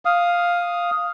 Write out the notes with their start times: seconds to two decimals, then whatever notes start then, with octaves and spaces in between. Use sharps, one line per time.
0.05 F5 D#6